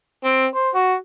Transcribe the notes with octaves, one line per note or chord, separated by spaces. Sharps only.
C4
C5
F#4